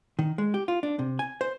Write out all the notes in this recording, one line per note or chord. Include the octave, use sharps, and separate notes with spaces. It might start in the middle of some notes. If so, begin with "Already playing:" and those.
D#3
G#3
G4
F4
D4
C3
G#5
C5